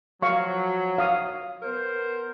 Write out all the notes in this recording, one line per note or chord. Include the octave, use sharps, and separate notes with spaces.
F3 F#3 F5 C#6
F5 D#6
B3 A#4 C5